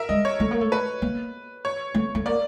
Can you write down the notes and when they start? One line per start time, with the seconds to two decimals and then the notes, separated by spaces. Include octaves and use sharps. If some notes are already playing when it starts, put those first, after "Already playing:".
Already playing: A#4 E5
0.09 G#3 D#5
0.25 C#5
0.40 A3
0.51 A#3
0.61 A3
0.72 B4
1.02 A#3
1.65 C#5
1.94 A3
2.15 A3
2.26 A#3 D5